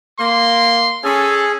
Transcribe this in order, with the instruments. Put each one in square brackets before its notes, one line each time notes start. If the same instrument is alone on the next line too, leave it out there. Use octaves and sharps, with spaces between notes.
[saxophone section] A#3 [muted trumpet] C6
[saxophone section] C#4 [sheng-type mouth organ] G#4 [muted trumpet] A4